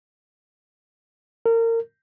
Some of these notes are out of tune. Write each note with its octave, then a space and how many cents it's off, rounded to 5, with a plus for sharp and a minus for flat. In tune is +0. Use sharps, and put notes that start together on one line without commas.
A#4 -30